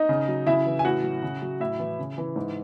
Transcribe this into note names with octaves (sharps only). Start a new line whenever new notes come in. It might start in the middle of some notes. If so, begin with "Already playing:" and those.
Already playing: D#4 D#5
C#3
F#3
C#3 E4 E5
E3
G#5
A2 F#4 F#5
F#3
C#3
F#3
A2 E4 E5
E3
C#3
E3
G#2